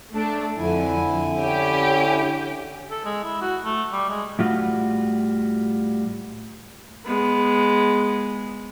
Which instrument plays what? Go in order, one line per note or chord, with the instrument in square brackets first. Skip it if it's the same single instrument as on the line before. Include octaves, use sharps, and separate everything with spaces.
[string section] A3 D4
[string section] F2 [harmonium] D3 E4 G#5
[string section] C#4 G4
[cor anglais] A4
G#3
E4
F#4
A3
G3
G#3
[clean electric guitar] A2 G3 F4 F#4
[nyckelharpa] G#3 B3